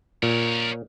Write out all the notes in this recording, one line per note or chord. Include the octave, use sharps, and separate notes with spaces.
A#2 A#4 C#5